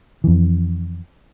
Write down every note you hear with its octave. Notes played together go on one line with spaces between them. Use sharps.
F2 E3